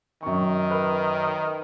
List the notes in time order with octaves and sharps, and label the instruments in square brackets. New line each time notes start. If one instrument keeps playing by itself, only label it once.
[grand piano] F#2 C#6 [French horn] D#3
[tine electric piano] A#4 B4